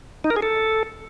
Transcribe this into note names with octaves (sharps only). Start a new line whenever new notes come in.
D#4
A#4
G#4
A4